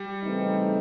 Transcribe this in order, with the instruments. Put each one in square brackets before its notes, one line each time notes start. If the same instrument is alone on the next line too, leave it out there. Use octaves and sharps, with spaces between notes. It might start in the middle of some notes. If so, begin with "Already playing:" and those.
Already playing: [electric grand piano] G3
[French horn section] C#3 E3 A3 C4 D#4